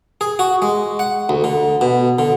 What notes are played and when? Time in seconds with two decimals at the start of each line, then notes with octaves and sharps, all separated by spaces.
0.21 G#4
0.39 F#4
0.62 G#3
0.99 F#5
1.29 D2
1.44 D3
1.81 B2
2.19 D3